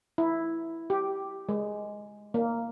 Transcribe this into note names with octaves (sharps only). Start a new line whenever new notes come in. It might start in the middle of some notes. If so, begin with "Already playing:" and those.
E4
G4
G#3
A#3